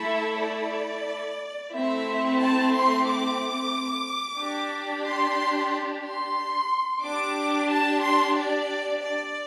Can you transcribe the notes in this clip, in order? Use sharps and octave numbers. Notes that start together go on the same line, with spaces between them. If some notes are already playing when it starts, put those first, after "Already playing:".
Already playing: A3 E4 A4 E5
D5
A3 C4 E4 E5
A5
C6
D6
D4 G4
C6
C6
D4 G4 D6
A5
C6
D5
D5